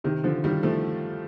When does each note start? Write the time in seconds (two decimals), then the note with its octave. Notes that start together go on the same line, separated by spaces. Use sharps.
0.04 C3 D#3
0.24 D3 F3
0.44 D#3 G3
0.63 F3 A3